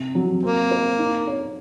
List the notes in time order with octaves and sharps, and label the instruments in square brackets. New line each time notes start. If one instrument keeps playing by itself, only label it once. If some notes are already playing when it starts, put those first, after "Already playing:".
Already playing: [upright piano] C3
F#3
[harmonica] A#3 [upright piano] C4
[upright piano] C5
D#4
C#5